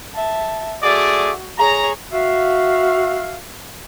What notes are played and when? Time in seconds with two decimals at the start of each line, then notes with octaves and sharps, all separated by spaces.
0.15 E5 A5
0.83 A3 F#4 G#4 D5
1.59 G#4 C#5 A#5
2.13 F#4 E5 F5